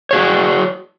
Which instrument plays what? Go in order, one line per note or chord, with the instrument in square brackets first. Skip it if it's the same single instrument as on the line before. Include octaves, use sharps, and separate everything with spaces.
[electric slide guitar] F#4 G#4 C#5